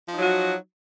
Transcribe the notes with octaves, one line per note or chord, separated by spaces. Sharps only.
F3 F#3 D#4 F#4